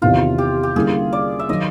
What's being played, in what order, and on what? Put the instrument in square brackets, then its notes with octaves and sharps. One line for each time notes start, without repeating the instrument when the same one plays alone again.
[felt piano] E2 C3 D#3 [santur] F4
[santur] G4
G4
[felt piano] D3 G3 A#3 C#4 E4 [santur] G#4
[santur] D5
E5
[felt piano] D#3 F#3 [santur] D#5